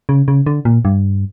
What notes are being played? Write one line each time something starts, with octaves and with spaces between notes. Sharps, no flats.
C#3
C#3
D3
A#2
G2